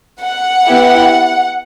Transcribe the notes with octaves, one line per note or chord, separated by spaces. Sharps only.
F#5
B3 E4 G4